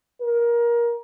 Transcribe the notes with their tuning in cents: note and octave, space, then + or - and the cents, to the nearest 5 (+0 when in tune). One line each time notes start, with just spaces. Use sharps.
A#4 +20